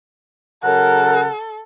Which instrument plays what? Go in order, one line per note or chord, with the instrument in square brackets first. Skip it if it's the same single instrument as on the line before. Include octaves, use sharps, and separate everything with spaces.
[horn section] C#3 F#3 A#4 [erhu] A4 [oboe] F#5